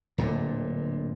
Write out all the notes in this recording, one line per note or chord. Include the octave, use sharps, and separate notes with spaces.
D1 A#2 D3